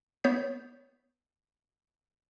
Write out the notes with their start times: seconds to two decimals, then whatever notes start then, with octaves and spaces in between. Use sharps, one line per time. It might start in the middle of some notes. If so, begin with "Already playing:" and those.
0.24 B3 C#5 G6 B6